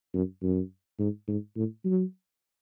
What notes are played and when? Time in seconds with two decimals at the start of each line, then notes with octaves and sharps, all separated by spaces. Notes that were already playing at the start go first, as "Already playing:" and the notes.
0.14 F#2
0.42 F#2
0.99 G#2
1.28 G#2
1.56 A2
1.85 F#3